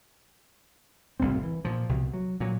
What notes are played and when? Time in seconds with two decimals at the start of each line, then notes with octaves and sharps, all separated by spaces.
1.20 F#1 C2 A2 C4
1.43 E3
1.65 A#2 F3
1.89 C2 B2
2.13 F#3
2.40 A#2 F#3